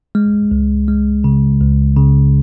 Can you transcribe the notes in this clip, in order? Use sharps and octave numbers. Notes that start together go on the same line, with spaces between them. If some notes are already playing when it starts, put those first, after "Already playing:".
G#3
C#2
G#3
C#3
C#2
C#3